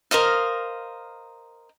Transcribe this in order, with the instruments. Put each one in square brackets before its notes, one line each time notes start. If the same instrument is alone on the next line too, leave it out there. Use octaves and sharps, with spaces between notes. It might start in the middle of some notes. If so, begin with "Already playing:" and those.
[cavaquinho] A#4 C5 D#5 F5